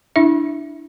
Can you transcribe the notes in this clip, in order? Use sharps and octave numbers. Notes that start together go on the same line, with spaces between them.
D4 E4 E5